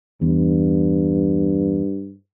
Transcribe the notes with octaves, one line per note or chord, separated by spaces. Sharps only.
E2 G2